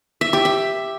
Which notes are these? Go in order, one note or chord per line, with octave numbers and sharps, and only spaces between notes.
E5
G4
E5